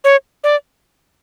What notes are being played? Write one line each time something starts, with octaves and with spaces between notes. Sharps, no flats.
C#5
D5